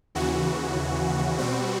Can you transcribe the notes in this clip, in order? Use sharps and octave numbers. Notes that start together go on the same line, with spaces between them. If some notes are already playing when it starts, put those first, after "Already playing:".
D#2 C#3 E3 F#4
B2 G3 C4 F#4